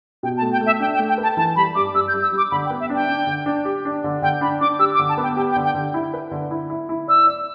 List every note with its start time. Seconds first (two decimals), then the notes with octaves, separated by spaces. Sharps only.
0.23 B2 G5
0.37 A5
0.42 A3
0.52 G5
0.61 A3 E5
0.80 D4 G5
0.94 G5
0.99 A3
1.09 G5
1.18 B4 A5
1.37 E3 A5
1.56 G3 B5
1.75 G2 D6
1.94 G2 E6
2.08 G6
2.14 G2
2.22 E6
2.32 G3
2.37 D6
2.51 D3 B5
2.65 G5
2.70 B3
2.80 E5
2.90 D4
2.95 G5
3.08 D4
3.27 D3
3.46 D4
3.65 G4
3.85 D4
4.04 D3
4.22 D3 G5
4.41 D4 B5
4.61 D4 D6
4.79 G4 E6
4.94 D6
4.99 D3
5.09 A5
5.18 B3
5.23 G5
5.37 G4 G5
5.51 G5
5.56 D3
5.65 G5
5.74 D3
5.94 E4
6.14 B4
6.31 D3
6.51 E4
6.70 E4
6.89 E4
7.08 D5 E6
7.27 D5